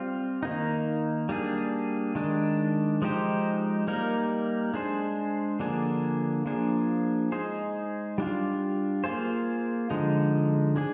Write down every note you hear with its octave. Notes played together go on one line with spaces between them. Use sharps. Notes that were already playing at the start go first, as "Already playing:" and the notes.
Already playing: G3 C4 F4
D#3 A#3 D#4
G3 A#3 D4 G#4
D#3 G#3 D4
F3 G#3 D#4 G4 C5
G3 A#3 D#4 A#4
G#3 D4 G#4 C5
D3 F3 A#3 D4 G#4
F3 A#3 D4 G#4
G#3 D#4 G#4 C5
G3 D4 F4
A#3 F4 G#4 C5
D3 F3 G#3 D#4
G#3 D4 G#4